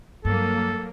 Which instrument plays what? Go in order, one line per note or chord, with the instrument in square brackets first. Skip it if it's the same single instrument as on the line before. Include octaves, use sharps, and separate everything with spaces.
[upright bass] G2 [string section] F#3 A#3 [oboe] A4